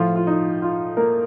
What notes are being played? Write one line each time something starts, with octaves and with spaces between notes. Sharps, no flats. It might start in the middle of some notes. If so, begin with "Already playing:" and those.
Already playing: A2 F3 F4
F4
D#4
F4
A#3 A#4